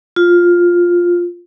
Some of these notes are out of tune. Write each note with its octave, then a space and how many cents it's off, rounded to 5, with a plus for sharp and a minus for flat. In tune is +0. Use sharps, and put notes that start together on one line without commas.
F4 +5